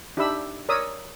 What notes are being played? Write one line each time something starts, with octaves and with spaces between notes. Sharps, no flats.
D4 D#4 G4 E5 B5 E6
A#4 C#5 D5 D#6 E6